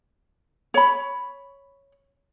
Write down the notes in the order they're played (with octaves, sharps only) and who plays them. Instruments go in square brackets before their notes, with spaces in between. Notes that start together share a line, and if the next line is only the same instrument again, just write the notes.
[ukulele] C#5 B5